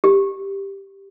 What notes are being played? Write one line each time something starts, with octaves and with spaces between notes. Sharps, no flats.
G4